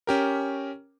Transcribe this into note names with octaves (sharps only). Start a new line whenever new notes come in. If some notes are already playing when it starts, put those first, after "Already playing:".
C#4 G4 A#4